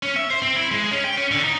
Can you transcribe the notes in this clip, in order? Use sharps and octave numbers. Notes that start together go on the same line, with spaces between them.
C#4
E5
C5
C4
E4
G#3
C#4
G5
C#4
D3
D#4